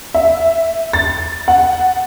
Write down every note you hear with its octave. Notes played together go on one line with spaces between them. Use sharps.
E5
A6
F#5